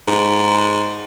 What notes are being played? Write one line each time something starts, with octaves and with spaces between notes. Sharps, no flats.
G#2